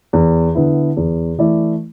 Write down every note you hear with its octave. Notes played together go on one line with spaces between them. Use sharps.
E2
D3 B3 E4
E2
E3 A3 E4 D5